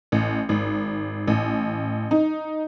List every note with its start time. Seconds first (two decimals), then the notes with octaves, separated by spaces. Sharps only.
0.12 A1
0.49 G#1
1.27 A1
2.11 D#4